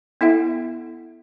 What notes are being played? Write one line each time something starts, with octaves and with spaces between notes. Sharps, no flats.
B3 E4 A4 E5 F#5